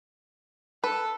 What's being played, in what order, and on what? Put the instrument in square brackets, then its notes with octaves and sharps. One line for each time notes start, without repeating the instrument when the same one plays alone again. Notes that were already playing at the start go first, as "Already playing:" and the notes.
[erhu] A4 [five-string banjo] B4